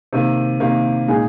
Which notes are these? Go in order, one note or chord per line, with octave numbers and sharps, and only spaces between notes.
C3 D#3 A#3
C3 D#3 A#3
A#2 G#3 D#4 G#4